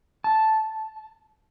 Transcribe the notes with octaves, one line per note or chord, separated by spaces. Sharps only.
A5